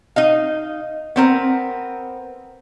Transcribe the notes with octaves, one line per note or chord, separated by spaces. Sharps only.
D#4 D#5 F5
B3 C4 A#4